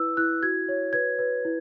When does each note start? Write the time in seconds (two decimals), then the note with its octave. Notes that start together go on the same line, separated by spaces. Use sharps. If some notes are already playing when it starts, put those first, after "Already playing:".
Already playing: E4 B4 E6
0.17 E4 F#6
0.43 F#4 G#6
0.69 C#5
0.93 B4 G#6
1.19 B4
1.45 E4